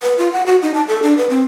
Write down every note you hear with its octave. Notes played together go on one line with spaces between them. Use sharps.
B4
F4
F#5
F#4
D#4
A5
A4
D4
B4
C4